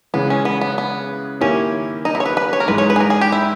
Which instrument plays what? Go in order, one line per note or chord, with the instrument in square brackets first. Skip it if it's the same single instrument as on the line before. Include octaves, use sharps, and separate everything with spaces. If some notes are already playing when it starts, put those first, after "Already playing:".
[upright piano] C#3 E3 G#3 [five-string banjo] B3
[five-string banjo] C#4
B3
B3
B3
[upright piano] D#3 A#3 E4 G4 [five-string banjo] C#4
[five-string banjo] D#4
E4
C#5
B4
B4
C#5
A#4
[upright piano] G#2 E3 G#3 [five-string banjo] B4
[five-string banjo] C#5
B4
G#4
A#4
G#4
G4
E4